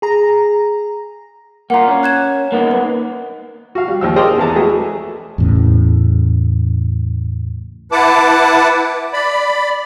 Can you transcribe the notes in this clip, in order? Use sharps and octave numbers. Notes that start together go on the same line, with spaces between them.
G#4 A#5
A#3 F4 F#5 A#5
C#4
F#6 G#6 E7
A#3 B3 D#4
B4
F#4 F5
G3
D#2 F3 E6
G#4 A#4 C5 D5 D#5 G5
E2 B3 A5 A#5
G#3 A3 F#4 G#4
E2 A2 C#3
E4 B4 F#5 A5 D6
D5 B5